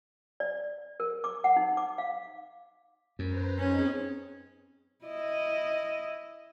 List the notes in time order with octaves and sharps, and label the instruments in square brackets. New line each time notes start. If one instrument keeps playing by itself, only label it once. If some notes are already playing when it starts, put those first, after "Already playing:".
[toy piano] D5
A#4
D6
F#5
D#4
D6
F5
[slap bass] F#2 [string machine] B4 C5 A#5
[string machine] C4 D#4 G#4 [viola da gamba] C#4
[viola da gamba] E4 D#5